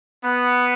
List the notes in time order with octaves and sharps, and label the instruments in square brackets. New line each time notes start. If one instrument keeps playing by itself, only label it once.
[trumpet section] B3